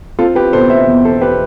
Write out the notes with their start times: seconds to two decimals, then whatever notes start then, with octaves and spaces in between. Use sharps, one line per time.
0.19 C4 F4 A4
0.36 G4 B4
0.52 B2 A4 C5
0.69 C5 E5
0.87 E2
1.04 A4 C5
1.21 G4 B4